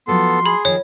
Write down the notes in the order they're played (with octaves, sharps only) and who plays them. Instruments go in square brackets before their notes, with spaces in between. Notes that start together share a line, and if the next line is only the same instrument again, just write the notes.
[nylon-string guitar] F3 F#3 A3 [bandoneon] B3 A4 [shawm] C6
[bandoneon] G#4 [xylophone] B5
[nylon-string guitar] D#3 F3 [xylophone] C#5